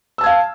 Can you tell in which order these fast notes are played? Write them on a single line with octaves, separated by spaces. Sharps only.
E6 A5 G#6 F5